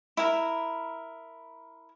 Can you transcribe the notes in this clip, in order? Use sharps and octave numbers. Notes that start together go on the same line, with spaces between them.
E4 A#4